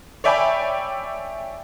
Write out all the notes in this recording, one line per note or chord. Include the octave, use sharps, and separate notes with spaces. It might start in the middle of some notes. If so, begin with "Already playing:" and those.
C#5 D5 E5 G5 G#5 B5